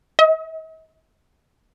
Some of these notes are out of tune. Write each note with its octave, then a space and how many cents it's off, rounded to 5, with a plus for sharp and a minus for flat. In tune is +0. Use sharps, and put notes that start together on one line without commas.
D#5 +45